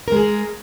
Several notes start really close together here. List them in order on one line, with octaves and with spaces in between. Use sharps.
A#4 G#3 G#4